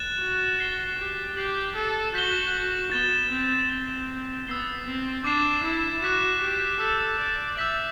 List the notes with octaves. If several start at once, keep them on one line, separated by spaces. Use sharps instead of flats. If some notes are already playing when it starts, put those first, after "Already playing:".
Already playing: F#6 A6 E7
F#4
A6 C7 G7
G4
G4 F#6 C7 F#7
A4
F#4 G6 B6 E7 G7
B3 A6 E7 G7
C4
C4 A6 E7 G7
B3 E6 A6 C7 G7
C4
D4 D6 A6 C7 E7
E4
F#4 D6 F#6 B6 E7
G4
A4 E6 G6 B6
D5
E5 E6 G6 B6 F#7